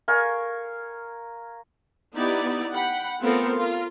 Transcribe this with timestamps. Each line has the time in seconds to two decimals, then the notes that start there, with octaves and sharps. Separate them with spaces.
0.08 A#4 F5 G#5 C#6
2.15 B3 D#4 E4 G4 D5
2.73 F#5 G5 B5
3.20 A3 B3 C4 F4 A4 A#4
3.56 F4 A#4